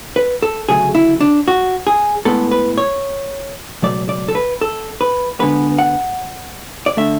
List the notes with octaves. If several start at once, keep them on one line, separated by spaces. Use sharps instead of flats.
B4
A4
D2 C#3 F#3 A3 G#4
E4
D4
F#4
G#4
A2 G#3 B3 A4
B4
C#5
C#2 B2 F#3 A3 D5
D5
A4
B4
A4
B4
D2 D3 G#3 B3 B4
F#5
D5
D3 A3 E5